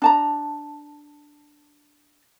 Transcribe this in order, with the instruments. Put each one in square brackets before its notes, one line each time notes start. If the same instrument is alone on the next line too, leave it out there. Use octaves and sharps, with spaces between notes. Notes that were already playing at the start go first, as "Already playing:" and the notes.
[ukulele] D4 A5 A#5